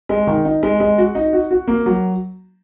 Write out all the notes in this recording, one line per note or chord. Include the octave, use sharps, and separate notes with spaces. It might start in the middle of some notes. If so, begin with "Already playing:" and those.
G#3
D#3
D#4
G#3
G#3
F#4
D#4
F#4
F#4
A#3
F#3